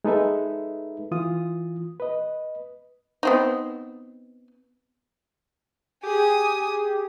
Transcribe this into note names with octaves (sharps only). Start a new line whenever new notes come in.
G#3 D#4 A4 B4 E5
E3 F4 D#6
B4 D#5
B3 C4 D#4
G4 G#4 G#5 D#6